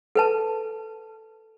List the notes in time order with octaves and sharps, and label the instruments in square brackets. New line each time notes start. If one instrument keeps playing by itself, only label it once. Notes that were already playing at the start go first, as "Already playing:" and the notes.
[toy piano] A4 B4 A5